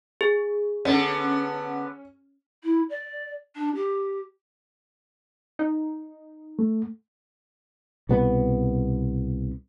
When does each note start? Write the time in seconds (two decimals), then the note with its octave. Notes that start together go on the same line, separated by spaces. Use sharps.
0.21 G#4
0.85 D3 B3 C#4
2.64 E4
2.89 D5
3.55 D4
3.75 G4
5.59 D#4
6.59 A3
8.09 C2 B2 B3